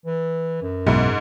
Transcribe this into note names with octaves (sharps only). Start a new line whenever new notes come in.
E3
F#2
B1 G#2 E4